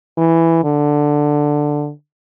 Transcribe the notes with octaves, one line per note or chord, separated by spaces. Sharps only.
E3
D3